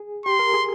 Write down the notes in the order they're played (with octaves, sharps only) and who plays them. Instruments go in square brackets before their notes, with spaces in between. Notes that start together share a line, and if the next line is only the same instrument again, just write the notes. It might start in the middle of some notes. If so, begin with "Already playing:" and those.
Already playing: [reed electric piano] G#4
[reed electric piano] G4 [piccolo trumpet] C6
[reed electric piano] A#4
G#4